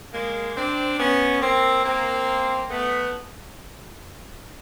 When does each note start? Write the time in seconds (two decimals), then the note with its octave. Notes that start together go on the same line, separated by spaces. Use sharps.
0.12 G#3 A#3
0.55 C4 D4
0.98 B3 C#4
1.40 A#3 C4
1.83 A#3 C4
2.70 A3 B3